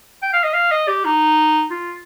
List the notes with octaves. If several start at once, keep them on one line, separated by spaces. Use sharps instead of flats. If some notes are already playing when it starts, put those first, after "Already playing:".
G5
F5
D#5
F5
D#5
G4
D#4
F4